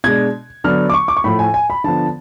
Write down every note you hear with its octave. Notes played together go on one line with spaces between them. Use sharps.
B2 G#3 D4 G#6
D3 F#3 B3 D4 F6
D6
C#6
D6
C#6
A2 F3 A3 B5
G#5
G#5
B5
D3 F3 B3 A5